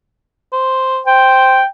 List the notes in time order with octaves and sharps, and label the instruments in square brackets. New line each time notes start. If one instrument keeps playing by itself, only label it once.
[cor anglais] C5
[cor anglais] C5 [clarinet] G5